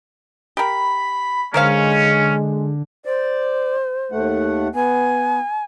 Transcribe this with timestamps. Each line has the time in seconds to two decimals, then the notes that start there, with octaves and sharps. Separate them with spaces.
0.57 G4 A#4 B5
1.54 D3 G#3 C#4 A#4 C5 F5
3.05 C5 D5
4.12 D#2 A3 F#5
4.75 B3 G#5